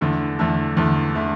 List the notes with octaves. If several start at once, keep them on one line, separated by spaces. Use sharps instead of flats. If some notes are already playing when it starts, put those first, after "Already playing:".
E2 D3 A3
E2 D3 A3
E2 D3 A3
D3 A3